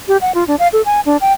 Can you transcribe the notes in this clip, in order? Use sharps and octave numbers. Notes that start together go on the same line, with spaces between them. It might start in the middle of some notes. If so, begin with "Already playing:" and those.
G4
F#5
F4
D4
F5
A4
G#5
D4
G5